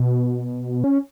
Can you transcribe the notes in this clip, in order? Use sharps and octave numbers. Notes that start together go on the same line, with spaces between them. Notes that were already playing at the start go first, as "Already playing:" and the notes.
Already playing: B2
C#4